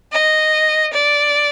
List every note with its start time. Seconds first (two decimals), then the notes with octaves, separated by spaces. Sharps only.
0.12 D#5
0.93 D5